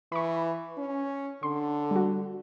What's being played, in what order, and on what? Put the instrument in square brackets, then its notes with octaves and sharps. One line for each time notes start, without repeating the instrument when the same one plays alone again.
[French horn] E3 [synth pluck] B5 C#6
[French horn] C#4
[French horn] D3 [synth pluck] C6
[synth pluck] G3 F#4